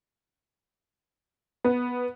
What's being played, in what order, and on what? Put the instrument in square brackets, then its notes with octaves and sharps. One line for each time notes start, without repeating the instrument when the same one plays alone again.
[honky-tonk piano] B3